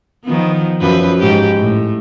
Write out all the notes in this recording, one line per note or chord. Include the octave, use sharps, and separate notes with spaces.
D#3 F3 B3
F#2 F3 B4
G#2 G4
A2